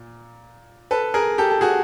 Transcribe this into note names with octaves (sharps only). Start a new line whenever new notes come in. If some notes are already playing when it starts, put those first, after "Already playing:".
Already playing: A#2
A4 B4
G#4 A#4
G4 A4
A4
F#4 G#4